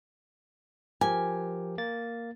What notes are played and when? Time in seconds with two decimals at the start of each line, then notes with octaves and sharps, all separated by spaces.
1.01 F3 G4 A#4 G#5
1.78 A#3 A6